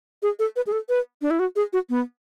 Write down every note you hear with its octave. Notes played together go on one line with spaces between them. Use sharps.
G#4
A4
B4
G#4
A4
B4
D4
E4
F#4
G#4
F#4
B3